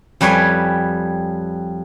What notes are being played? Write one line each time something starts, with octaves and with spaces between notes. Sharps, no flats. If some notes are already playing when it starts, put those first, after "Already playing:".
F2 G3 B4 C#5 G#5